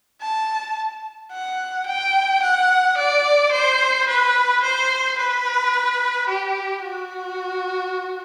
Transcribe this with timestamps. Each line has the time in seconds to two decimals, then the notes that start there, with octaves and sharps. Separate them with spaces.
0.21 A5
1.32 F#5
1.86 G5
2.42 F#5
2.97 D5
3.52 C5
4.08 B4
4.63 C5
5.18 B4
6.28 G4
6.83 F#4